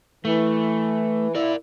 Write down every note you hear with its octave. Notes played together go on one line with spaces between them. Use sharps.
E3 A3
E4 A#4 D5